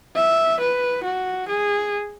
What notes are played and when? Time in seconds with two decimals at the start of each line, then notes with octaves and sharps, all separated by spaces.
0.16 E5
0.60 B4
1.04 F#4
1.48 G#4